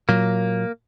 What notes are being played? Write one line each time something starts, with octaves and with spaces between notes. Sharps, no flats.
A#2 F#3 A#3